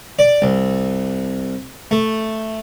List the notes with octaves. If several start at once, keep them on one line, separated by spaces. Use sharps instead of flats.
D5
C2
A3